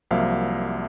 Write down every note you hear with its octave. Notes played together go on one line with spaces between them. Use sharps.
C2 F3 F#3 A#3 E5 F5